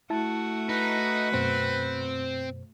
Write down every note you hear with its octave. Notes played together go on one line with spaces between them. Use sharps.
A3 E4 F#4 A5
D#4 B4
F#2 B2 C4 C5